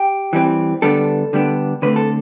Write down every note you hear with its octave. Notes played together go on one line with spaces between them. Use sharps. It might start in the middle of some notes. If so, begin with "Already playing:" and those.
Already playing: G4
E3 G3 C4
D3 G3 B3 D4 A4
D3 G3 B3 D4
D3 A3 C4 B4
A4